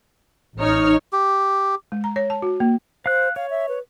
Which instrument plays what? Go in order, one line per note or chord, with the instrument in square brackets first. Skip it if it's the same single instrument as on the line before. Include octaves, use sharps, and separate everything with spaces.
[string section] A1 C#5 F6 [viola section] D#4
[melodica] G4
[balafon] G#3
A#5
C#5
A5
F#4
A#3
[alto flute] C5 [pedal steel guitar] F5 F#6
[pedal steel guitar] C#5 [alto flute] F5
[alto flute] E5
B4